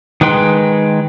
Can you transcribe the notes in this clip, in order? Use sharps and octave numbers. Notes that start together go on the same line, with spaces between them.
D#3 G#3 B4 G5 C6